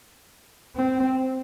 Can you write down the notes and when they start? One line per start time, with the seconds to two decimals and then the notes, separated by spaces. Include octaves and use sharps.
0.75 C4